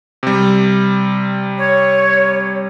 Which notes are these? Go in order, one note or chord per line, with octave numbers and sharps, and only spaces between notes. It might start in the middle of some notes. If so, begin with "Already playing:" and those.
C3 G3
C#5